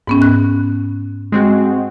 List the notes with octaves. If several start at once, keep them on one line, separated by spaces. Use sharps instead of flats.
G#2 B3 C#4
F#6
G#3 C4 F#4